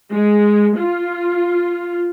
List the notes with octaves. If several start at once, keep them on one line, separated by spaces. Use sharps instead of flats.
G#3
F4